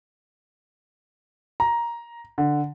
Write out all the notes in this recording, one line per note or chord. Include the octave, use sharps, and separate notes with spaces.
A#5
D3